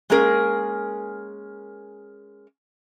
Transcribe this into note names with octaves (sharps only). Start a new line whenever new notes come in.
G#3 A#3 C#4 G#4 A#4